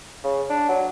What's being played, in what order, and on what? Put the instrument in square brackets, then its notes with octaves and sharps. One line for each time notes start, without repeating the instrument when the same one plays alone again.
[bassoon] C#3
D4
F#3